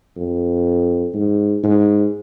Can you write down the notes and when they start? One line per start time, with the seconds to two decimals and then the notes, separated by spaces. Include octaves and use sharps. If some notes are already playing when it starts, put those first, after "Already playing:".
0.16 F2
1.14 G#2
1.63 G#2